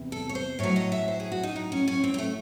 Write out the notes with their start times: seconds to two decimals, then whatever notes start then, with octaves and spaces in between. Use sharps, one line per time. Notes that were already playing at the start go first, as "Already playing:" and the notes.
Already playing: E2 C3
0.12 A4
0.29 C#5
0.35 C5
0.59 A2 F#3 C#5
0.76 D#5
0.92 E5
1.08 C5
1.20 G#4
1.32 F#4
1.43 D#4
1.56 D#4
1.72 C#4
1.88 C#4
2.04 C4
2.14 C4
2.19 A3